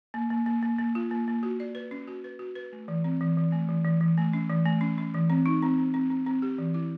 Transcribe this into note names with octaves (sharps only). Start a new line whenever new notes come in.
A#3
A#3
A#3
A#3
A#3
F4
A#3
A#3
F#4
D5
B4
C#4
F#4
B4
F#4
B4
A3
E3
C4
E3
E3
A3
E3
E3
E3
A3
C#4
E3
A3
C#4
C#4
E3
C4
D#4
C4
C4
C4
C4
C4
G4
E3
E4